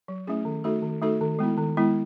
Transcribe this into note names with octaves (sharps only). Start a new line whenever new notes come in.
F#3
A3 C#4 E4 G#4
D#3
A3 D#4 F#4 A4
D#3
A3 D#4 F#4 A4
D#3
G#3 B3 E4
D#3
G#3 B3 E4